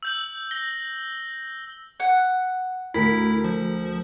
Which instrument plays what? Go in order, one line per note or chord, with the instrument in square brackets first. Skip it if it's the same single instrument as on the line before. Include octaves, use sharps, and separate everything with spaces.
[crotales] E6 G6 F#7
A#6 G7
[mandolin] F#5
[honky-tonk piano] D2 A#4 B6 [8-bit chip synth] E4
[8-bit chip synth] F3